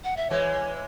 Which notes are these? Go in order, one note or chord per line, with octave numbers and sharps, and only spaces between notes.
F#5
E5
E3 G#3 C#5